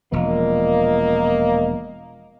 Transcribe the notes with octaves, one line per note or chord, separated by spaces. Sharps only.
E1 A#2 F3 A#3 D#5